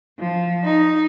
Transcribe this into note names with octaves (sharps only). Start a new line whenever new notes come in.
F3
D#4